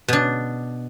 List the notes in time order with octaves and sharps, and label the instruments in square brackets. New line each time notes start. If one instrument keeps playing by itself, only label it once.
[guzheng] B2 D4